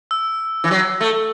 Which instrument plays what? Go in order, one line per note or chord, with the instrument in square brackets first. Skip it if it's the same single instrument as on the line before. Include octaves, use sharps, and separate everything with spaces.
[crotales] E6
[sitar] E3
F#3
A3